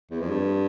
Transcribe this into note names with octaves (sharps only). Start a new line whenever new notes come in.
E2
F2
G2